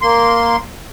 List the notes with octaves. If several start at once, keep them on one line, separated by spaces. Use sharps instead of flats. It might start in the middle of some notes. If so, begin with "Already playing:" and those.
A#3 C6